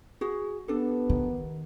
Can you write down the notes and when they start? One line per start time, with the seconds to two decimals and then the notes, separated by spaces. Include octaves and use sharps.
0.21 F#4 G#4
0.68 B3 D4 G4 A4
1.10 D#3